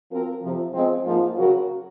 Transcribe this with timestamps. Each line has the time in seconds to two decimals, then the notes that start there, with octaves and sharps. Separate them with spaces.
0.10 F3 C4 F#4 A#4
0.42 F2 C3 F3
0.74 F3 G#3 C4
1.04 G#2 F3 A#3 F4
1.37 C#3 F#3 C#4 F#4 A#4